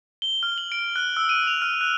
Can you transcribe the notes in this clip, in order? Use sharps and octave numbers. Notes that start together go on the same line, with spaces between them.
G7
F6
F#7
D7
F#6
E6
D#7
F7
F6
F#6